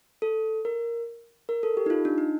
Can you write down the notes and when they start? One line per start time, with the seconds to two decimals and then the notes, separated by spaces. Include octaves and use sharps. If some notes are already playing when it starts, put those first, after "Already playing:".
0.22 A4
0.65 A#4
1.49 A#4
1.63 A4
1.77 G4
1.86 D#4
1.90 F4
2.05 D4
2.18 D#4